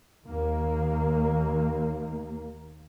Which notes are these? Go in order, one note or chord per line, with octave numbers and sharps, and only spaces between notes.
D#2 D#3 A#3